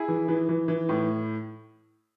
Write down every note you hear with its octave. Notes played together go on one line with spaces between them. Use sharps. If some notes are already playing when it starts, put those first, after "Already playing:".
Already playing: E4 G#4
E3
E3
E3
E3
A2